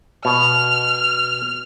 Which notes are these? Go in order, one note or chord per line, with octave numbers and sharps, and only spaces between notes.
B2 F6